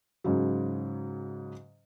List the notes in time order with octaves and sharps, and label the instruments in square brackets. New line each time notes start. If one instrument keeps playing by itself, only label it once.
[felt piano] G#2 C#3 F#3